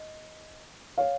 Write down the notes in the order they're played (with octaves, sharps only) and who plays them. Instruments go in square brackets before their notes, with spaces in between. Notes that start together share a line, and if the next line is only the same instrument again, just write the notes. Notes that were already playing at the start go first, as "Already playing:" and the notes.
Already playing: [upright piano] D#5
C#5 F5